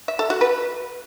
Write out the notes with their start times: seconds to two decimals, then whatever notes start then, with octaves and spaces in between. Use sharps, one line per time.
0.08 E5
0.19 A4
0.30 F#4
0.41 B4